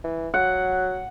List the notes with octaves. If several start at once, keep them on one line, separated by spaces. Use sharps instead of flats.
E3
F#3 F#5